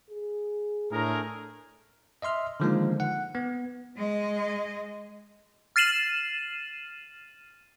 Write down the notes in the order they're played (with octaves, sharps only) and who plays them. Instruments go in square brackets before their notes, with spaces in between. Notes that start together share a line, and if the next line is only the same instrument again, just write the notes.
[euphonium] G#4
[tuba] A2 [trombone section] A3 G#4 A#4 [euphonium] D4
[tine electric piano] D#5 E5 C6 F6
D3 D#3 F3 G#3 A#3 D#4
F#5
B3
[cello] G#3 D#5
[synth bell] F6 A6 C7 D#7 E7 F#7